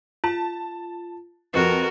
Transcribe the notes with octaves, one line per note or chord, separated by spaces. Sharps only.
F4 A5
F2 F3 F#4 A#4 B4 F#6